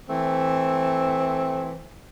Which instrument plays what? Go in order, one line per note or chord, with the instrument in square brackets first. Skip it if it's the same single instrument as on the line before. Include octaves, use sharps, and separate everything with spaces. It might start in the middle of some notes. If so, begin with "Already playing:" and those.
[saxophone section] E3 A3 C4